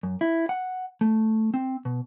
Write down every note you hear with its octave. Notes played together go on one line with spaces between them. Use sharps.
F#2
E4
F#5
A3
C4
B2